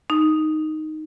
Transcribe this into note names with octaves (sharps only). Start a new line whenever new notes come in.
D#4